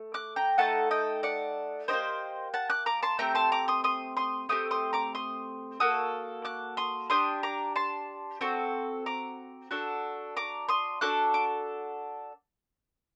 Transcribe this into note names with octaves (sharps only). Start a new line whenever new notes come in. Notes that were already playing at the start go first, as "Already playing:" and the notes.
Already playing: A3
D6 F#6
G5 A#5
A3 D#4 A4 F#5 A5
D#5 G5
D5 F#5
D#4 G4 C5 D#5
A#3
F#5 A5
D6 F#6
A#5 D6
A5 C6
A3 C4 G4 G5 A#5
A5 C6
A#5 D6
C6 D#6
C6 D#6
C6 D#6
A3 C4 G4 D#6
C6 D#6
A#5 D6
C6 D#6
A#3 F#4 A4 D#6
D6 F#6
C6 D#6
D4 G4 C6 D#6
A#5 D6
A5 C6
C4 F#4 A4
A#5 D6
D4 F#4 A4
A#5 D6
C6 D#6
D4 F#4 A4 D6 F#6
D6